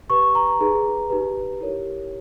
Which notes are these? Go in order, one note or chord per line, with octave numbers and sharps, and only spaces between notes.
G4 B4 C#6
C#6
A#5
A#5
D#4 G#4 B4
D#4 G4 B4
E4 G4 A#4 C#5